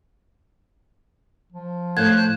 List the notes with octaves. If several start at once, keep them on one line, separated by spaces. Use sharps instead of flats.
F3
A2 A4 C5 F5 F#6 G#6